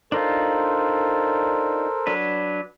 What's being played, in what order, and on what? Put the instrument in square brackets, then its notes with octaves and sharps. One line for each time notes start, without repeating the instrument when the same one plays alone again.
[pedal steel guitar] D4 D#4 F4 [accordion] A4 A#4 C5
[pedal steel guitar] F#3 D4 B4